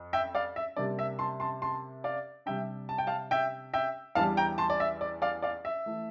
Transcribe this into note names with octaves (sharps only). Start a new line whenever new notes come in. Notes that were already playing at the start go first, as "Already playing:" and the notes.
Already playing: F2
E5 G5
D5 F5
E5
C3 G3 A#3 D4 D5
E5
A5 C6
A5 C6
A5 C6
D5 F5
C3 G3 D4 E5 G5
A5
G5
F5 A5
E5 G5
E5 G5
E2 E3 G3 D4 F5 A5
G5 A#5
A5 C6
D5
E5
D5
D5 F5
D5 F5
E5
E3 A3